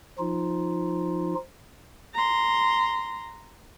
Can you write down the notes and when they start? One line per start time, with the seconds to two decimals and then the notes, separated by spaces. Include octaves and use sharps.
0.18 F3 D#4 F4
2.14 A#5 C6